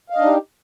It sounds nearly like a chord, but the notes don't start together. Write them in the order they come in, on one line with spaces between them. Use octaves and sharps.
F5 D#5 D4 D#4 G4